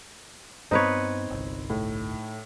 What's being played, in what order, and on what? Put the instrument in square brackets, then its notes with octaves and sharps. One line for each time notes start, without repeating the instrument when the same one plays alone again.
[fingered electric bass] G2 B3 [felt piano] C4 [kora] D#4 B4 C#5
[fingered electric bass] G1 C2
[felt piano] A2